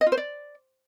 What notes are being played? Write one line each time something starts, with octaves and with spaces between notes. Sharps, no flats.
D#5
F4
C5
D5